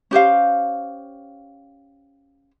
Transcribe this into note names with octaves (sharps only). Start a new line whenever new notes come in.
C#4 G4 C5 F5